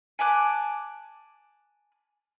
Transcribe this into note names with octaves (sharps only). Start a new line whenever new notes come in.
G#5 A5 D6 F#6